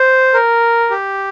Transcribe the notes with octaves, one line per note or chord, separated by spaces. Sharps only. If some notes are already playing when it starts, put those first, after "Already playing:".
Already playing: C5
A#4
G4